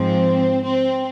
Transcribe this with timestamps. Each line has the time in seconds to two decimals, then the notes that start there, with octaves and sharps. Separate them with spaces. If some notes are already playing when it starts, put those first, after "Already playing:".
Already playing: G#2 F3 C4
0.63 C4